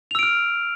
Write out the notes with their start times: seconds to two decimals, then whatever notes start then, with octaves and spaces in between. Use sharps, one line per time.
0.11 F7
0.15 E6
0.19 D7
0.23 F6